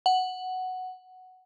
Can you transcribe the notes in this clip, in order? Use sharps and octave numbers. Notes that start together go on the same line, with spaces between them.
F#5